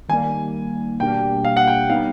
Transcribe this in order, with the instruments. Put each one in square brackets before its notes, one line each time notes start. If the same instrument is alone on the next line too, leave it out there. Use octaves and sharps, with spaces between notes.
[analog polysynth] D#3 G3 A#3 [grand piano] G#5
[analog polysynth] B2 G3 A#3 D4 G4 [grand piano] G5
[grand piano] F5
F#5
G5
[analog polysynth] G3 B3 D#4 [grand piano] F5